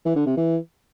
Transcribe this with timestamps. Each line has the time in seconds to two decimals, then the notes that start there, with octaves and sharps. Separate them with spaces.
0.05 E3
0.16 D3
0.26 C3
0.37 E3